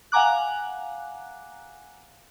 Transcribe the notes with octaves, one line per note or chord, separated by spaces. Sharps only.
F5 F#5 G#5 A#5 D6 F#6